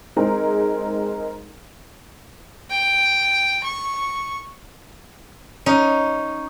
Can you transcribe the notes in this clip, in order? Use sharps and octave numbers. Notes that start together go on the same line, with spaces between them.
G#3 C4 D#4 G#4 A#4
G5
C#6
C#4 D#4